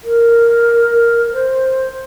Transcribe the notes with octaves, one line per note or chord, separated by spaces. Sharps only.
A#4
C5